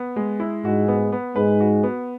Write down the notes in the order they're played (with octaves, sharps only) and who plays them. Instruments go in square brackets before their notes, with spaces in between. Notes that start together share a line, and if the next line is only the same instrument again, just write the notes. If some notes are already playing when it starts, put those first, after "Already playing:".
Already playing: [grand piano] B3
G#3
E4
[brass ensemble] G#2 G#3 [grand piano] F#4
[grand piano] B3
B3
[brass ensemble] G#2 G#3 [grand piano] B4
[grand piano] F#4
B3